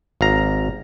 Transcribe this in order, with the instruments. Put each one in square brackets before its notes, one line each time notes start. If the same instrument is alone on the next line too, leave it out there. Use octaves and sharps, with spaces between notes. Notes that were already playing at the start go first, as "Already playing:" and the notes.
[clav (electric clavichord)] G#1 F5 A#5